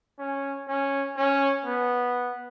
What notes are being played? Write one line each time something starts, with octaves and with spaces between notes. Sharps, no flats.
C#4
C#4
C#4
B3